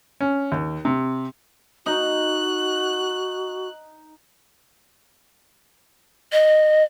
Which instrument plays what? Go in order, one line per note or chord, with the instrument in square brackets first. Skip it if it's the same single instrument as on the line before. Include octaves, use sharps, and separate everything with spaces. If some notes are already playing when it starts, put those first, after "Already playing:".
[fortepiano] C#4
D#2
C3
[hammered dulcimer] D#4 [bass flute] F#4 [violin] F#6
[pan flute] D#5